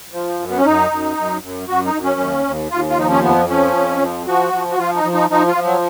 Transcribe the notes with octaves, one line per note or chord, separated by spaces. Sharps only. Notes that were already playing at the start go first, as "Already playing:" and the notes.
F3
F#2
B3
C#4
F#2 D#4
F#2
F#2
F#2
F#2 F#4
D#4
F#2
C#4
D#2
D#2
D#2 F4
F4
F3 D#4
C#4
F2 B3
F3 C#4
F2
F3
F3 F#4
F3
F#4
F3 F4
D#4
F3
D#4
F3 D#4
F4
F3
F#3